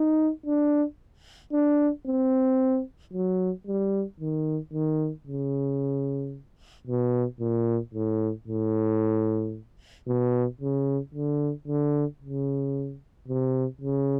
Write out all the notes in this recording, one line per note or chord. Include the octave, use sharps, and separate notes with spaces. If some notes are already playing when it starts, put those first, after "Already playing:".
Already playing: D#4
D4
D4
C4
F#3
G3
D#3
D#3
C#3
B2
A#2
A2
A2
B2
C#3
D3
D3
C#3
C3
C#3